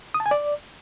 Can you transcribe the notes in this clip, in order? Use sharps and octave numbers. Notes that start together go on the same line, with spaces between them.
D#6
A5
G#5
D5